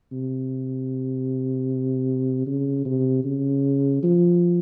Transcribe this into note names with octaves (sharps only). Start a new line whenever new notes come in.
C3
C#3
C3
C#3
F3